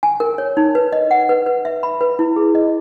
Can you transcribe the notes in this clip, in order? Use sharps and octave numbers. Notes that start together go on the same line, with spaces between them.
G#5
A#4
C#5
D#4
B4
D#5
F#5
B4
B4
E5
B5
B4
E4
G#4
D#5